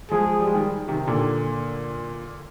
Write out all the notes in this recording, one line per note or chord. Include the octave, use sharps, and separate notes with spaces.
F3 G#3 G#4
G3
G#3
D#3 G3
C3 D#3
A#2 D3